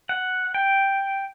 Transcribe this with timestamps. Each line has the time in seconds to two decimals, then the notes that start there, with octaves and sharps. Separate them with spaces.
0.09 F#5
0.54 G5